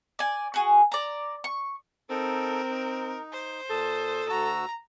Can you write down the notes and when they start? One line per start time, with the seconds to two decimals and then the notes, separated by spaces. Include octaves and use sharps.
0.19 D5 G#5
0.54 F#4 G#4
0.92 D5 A#5
1.44 C#6
2.10 C4 D#4 A4 A#4
2.70 D#4
3.33 C5
3.70 A#2 A4 A5 D#6
4.29 D2 F#4 A#5 E6